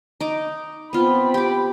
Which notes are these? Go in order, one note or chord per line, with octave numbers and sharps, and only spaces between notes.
D#4 D6
B3 C4 F4 B5
G4 D6